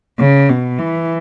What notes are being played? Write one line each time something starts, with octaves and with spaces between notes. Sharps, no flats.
C#3
B2
E3